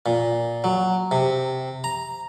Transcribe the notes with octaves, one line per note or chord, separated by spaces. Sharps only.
A#2
F#3
C3
A#5